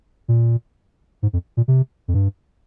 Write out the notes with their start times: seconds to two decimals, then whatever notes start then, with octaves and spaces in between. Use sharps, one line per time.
0.28 A#2
1.23 G#2
1.33 F2
1.57 A#2
1.68 C3
2.08 F2
2.14 G2